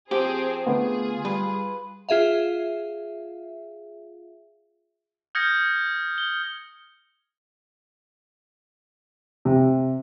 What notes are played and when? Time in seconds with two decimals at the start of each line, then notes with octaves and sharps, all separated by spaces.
0.11 F3 C4 G4 G#4
0.67 D3 A3 B3 F4 G#4
1.25 G3 B4
2.09 F4 G#4 E5 F5
5.35 D#6 F6 G6 G#6 A#6 C#7
6.18 G7
9.45 C3